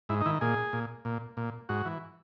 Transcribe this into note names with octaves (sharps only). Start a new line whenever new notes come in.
G#2 E4
D#4
D#3 E4
A#2 G#4
A#2
A#2
A#2
G#2 F#4
E3